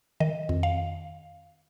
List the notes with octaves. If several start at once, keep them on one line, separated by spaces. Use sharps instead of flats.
D#3 D#5
F2
F5